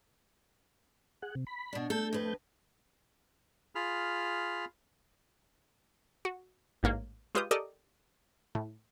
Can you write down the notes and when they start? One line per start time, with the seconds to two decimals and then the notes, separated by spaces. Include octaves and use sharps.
1.22 G#4 F#5
1.35 C3
1.47 B5
1.73 B2 D4
1.90 A3 A4 G6
2.13 F2 B4
3.75 F4 G#4 B5 F6
6.25 F#4
6.83 A1 G#2 A#3 C#5
7.35 G#3 F4 G4 B4 D#6 G6
7.51 G4 A4 A#4 D5 D#5
8.55 A2